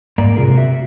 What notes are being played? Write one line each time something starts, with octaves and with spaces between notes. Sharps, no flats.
G#2 A#3 A#4 D5 A#5
C3 F4 G#4 A#4
F#4 E5